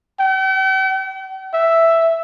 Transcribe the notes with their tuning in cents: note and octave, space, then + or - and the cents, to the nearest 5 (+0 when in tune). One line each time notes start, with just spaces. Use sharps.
G5 -45
E5 +5